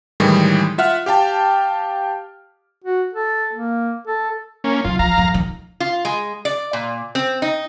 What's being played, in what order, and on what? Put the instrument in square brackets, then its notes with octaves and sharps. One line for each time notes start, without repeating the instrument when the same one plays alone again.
[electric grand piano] A2 D#3 E3 G3 G#3
F4 E5 F#5 F6
G4 F5 G5 A5
[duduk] F#4
A4
A#3
A4
[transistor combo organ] A#3 C#4
[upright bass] F#2 C#3 [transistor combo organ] F4
[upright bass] F3 [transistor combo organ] F5 A#5
[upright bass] F2
F2 D#3
[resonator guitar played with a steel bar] F4
G#3
D5
A#2
C4
D#4